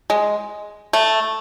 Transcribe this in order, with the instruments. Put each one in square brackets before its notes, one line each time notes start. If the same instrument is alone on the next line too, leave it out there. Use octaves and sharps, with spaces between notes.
[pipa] G#3
A3